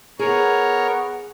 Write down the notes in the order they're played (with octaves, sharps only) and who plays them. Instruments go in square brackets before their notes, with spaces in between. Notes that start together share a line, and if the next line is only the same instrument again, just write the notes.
[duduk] B3 [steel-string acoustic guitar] G#4 [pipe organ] A#4 C#5